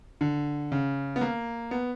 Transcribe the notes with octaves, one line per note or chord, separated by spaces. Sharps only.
D3
C#3
B3
A#3
B3